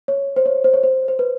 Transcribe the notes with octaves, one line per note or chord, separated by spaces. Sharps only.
C#5
C5
C#5
C5
C#5
C5
C5
B4